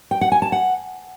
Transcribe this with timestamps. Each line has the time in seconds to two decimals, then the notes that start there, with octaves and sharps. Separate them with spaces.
0.11 G5
0.21 F#5
0.32 G#5
0.42 A5
0.52 F#5